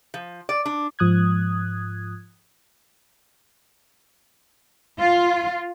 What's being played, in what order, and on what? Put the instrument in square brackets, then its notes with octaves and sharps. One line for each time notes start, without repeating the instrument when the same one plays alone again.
[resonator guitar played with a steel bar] F3
D5
D4
[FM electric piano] G#2 F3 D#6 F#6 G#6
[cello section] F4